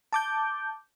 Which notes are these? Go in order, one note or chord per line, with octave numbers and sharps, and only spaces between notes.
A5 D6 G6